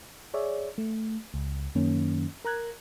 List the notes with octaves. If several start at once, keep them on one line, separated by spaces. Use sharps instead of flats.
G#4 C#5 D5 E5
A3
C#2
F#2 D#3 A#3 C#4
A#4 A#5 F#6 G#6